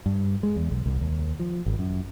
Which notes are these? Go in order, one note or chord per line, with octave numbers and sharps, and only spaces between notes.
G2
G#3
E2
B1
C2
D#2
F3
G#1
F#2